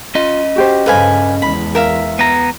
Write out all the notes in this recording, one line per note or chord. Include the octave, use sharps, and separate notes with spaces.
C#4 F4 D#5
F#4 G4 C5
G2 C#3 A4 B4 C5 F5 G#5
E2 G#3 B5
A#4 E5 F5
B3 A#5